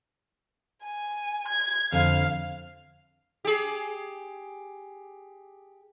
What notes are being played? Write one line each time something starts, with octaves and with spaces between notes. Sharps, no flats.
G#5
G#6
F2 D3 F5
G4 G#4